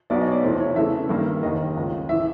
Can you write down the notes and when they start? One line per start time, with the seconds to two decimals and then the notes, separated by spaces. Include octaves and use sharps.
0.10 B1 B2 F#3 D5
0.21 D#5
0.26 C#5
0.31 D5
0.43 E2 C3 F3 A3 C5
0.60 C#5
0.76 E2 C#3 E3 A3 E5
1.09 G2 D#3 G3 A#3
1.43 F1 D#2 D#3 D#5
1.76 C#2 C#3 F3
2.09 A2 E3 E5